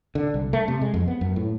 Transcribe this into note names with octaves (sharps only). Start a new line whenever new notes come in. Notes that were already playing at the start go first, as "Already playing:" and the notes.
D3
C2
A3
C3
G#3
F2
B3
F#2
A2